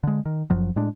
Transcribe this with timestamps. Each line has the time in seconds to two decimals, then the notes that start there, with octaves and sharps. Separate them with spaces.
0.03 D3 G#3
0.26 D#3
0.50 F#1 F#2 F3 F#3
0.76 A2 G#3 D4